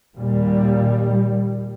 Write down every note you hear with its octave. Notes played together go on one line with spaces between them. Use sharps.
D#2 A#2 G3